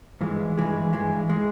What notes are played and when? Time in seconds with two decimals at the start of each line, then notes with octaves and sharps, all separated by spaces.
0.21 G2 E3 G#3
0.57 G2 E3 G#3
0.93 G2 E3 G#3
1.30 E3 G#3